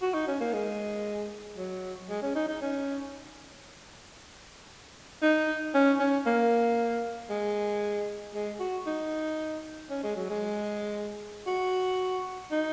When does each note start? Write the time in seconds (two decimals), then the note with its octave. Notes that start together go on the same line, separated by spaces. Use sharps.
0.02 F#4
0.14 D#4
0.28 C#4
0.41 A#3
0.53 G#3
1.57 F#3
2.10 G#3
2.23 C#4
2.35 D#4
2.49 D#4
2.62 C#4
5.22 D#4
5.74 C#4
6.00 C#4
6.26 A#3
7.30 G#3
8.34 G#3
8.60 F#4
8.87 D#4
9.90 C#4
10.03 G#3
10.17 F#3
10.30 G#3
11.47 F#4
12.51 D#4